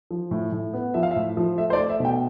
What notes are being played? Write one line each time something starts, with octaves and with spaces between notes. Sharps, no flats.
F3
A2
A2
B3
F3 E5
F5
E5
A2
F3
A3 E5
C5
D5
A3
E5
B2 G5